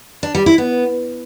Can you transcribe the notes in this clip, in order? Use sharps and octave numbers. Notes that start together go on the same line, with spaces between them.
D4
G3
E4
B3